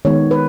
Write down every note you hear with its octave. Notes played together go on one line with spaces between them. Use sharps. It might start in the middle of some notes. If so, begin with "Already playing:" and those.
D#3 G#3 B3 C#5
B4